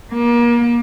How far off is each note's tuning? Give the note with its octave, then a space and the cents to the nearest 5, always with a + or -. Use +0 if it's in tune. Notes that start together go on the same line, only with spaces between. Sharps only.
A#3 +30